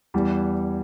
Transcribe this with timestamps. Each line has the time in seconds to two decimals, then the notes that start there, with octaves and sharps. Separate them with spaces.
0.14 E2 E3 G3